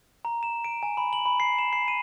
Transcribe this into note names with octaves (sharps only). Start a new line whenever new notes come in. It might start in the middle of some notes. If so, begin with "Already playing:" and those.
A#5
E7
D7
G#5
B5
F#7
B5
C7
E7
C7
D#7